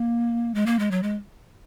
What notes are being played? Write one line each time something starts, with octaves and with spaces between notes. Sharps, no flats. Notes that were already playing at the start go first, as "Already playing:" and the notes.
Already playing: A#3
G#3
A#3
G#3
F#3
G#3